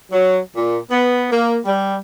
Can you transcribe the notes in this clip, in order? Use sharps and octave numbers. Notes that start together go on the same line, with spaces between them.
F#3
A#2
B3
A#3
G3